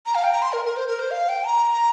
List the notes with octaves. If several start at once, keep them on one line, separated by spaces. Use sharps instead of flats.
A#5
F5
G5
A#5
C6
A#4
A#4
C5
A#4
C5
F5
G5
A#5